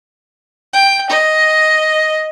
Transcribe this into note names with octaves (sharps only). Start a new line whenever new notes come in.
G5
D#5